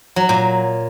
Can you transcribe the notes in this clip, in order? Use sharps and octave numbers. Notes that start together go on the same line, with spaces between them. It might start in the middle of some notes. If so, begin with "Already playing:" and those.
F#3
A#2